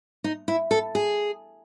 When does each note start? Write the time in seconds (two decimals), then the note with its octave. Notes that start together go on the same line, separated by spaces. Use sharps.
0.24 D#4
0.48 E4
0.71 A4
0.95 G#4